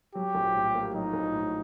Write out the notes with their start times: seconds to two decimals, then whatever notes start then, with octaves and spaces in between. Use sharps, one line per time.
0.15 F#3 G4
0.35 A#1
0.55 A2
0.74 A#3
0.94 F#3 D#4
1.13 A#1
1.32 A2